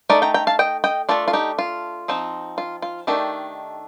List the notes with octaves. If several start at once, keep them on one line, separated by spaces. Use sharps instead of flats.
A3 D#4 A#4 D5
G5 A#5
G5 A#5
F5 A5
D#5 G5
D#5 G5
A3 D4 F4 A4
F4
D#4 G4
F4
F3 C4 D#4
F4
F4
D#3 A3 D4 D#4 G4